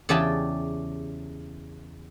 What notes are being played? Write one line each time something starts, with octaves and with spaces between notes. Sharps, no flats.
E2 C#3 G4 D5 G#5 A5